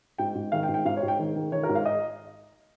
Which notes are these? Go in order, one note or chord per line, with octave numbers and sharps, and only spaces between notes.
G#2 G5
G#2
D#3 F5
G5
G#2
G5
G#2 F5
C#5
G#2
G5
D#3
D#3
D#3 C#5
A#4
G#2
F5
D#5